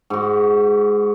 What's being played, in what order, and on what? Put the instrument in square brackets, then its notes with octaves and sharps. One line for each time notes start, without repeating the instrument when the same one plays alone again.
[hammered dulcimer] G#2 F#4